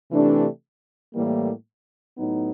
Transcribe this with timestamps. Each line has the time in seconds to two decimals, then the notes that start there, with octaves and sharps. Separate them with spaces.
0.11 C3 E3 A3 D4 G4
1.14 A2 E3 G3 A#3
2.17 A2 F#3 B3 D#4